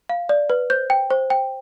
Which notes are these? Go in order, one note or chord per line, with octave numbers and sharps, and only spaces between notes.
F5
D5
B4
C5 G6
G5
C5
G5